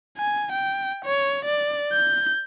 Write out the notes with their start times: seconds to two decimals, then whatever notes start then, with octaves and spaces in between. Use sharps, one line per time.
0.18 G#5
0.52 G5
1.05 C#5
1.45 D5
1.93 G6